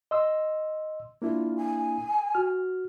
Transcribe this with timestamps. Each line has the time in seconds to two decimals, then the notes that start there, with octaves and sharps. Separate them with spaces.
0.11 D#5 C6 E6
1.22 A#3 D4 E4 F4
1.56 G#5
2.35 F#4 F6